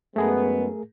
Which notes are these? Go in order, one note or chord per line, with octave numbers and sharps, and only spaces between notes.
F#2 G#3 A3 B3 G#4 A#4